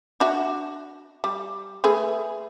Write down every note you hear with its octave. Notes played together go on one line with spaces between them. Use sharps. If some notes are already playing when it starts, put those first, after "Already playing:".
D4 F#4 E5
G3
A3 G#4 B4